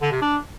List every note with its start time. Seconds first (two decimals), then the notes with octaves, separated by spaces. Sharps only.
0.02 D3
0.12 C3
0.22 D4